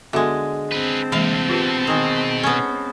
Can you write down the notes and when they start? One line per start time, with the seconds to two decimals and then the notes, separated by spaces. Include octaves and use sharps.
0.13 D3 G#3 B3 F#4 E5
0.72 C4 G#4 B4 A5
1.12 C2 A2 E3 G#3 A#3 F5
1.49 B2 F4 G4 B4
1.87 D#3 G#3
2.43 B3 C#4